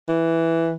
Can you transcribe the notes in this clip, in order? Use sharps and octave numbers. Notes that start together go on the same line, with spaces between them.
E3